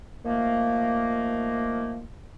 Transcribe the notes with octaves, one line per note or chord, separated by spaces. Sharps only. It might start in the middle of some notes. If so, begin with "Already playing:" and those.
D#3 F3 A3 A#3